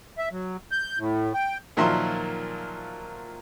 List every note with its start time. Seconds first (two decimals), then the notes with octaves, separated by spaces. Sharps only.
0.18 E5
0.31 F#3
0.71 G6
0.99 A2
1.34 G5
1.77 A#2 D#3 F3 F#3 E5 C6